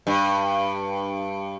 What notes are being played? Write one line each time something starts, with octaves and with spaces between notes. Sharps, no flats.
G2